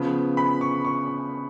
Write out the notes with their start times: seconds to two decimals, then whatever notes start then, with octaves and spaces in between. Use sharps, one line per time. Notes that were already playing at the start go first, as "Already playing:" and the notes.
Already playing: C#3 F3 B3
0.37 B5
0.61 C#6
0.85 C#6